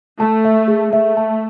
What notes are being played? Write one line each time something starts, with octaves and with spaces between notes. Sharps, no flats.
A3 A5
E5
G#4
A3 E5
A5